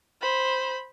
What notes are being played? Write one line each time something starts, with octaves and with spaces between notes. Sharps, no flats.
C5 B5